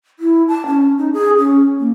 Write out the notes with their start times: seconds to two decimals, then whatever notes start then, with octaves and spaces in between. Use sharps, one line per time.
0.19 E4
0.48 A5
0.66 C#4
0.98 D#4
1.13 G#4
1.38 C#4
1.79 A#3